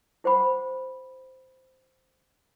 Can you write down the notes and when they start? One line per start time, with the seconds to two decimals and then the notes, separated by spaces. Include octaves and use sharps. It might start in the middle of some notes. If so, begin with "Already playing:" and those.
0.24 E4 C5 F#5 B5